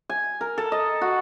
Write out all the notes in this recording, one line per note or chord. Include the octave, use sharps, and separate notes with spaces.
G#5
A#4
A4
D#5
F#4